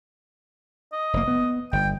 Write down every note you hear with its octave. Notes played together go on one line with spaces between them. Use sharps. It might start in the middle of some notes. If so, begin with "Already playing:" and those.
D#5
F1 A#3
B3
G1 G5